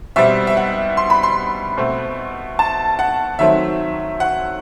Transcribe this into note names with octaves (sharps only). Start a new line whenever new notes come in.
B2 G3 C4 E5
E5
F#5
C6
B5
C6
B2 A3 C4
A5
F#5
D#3 F#3 A3 C4 E5
F#5